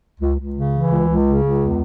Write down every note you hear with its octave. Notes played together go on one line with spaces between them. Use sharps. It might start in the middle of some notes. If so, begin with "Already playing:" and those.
C#2
C#2
C#3
E3
C#2
C#2
C#3
C#2
E2